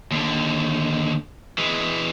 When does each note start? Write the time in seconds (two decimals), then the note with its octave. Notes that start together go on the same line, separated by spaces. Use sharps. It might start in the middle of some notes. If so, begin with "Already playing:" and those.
0.11 D#2 D3
1.58 E3 G#3